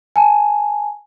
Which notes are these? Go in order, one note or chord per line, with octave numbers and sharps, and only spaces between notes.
G#5 A5